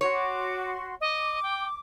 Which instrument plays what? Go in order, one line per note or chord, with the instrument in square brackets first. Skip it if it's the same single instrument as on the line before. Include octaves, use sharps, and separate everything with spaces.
[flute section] F#4 C6 [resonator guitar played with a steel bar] C#5
[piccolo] D6
[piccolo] D#5 [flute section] D6
[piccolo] G5